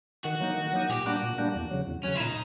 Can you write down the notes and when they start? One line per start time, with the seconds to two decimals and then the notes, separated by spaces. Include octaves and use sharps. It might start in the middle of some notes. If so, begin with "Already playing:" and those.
0.24 D#3 F#4
0.40 F#3 A#3 D#4
0.57 D#3
0.73 F#3 A#3 D#4
0.89 A#2 G4
1.06 G3 A#3 D4 F#4
1.23 A#2
1.38 G3 A#3 D4
1.55 E2
1.71 C#3 F#3
1.87 E2
2.03 C#3 F#3 C#4
2.15 E4
2.20 A#2 D#4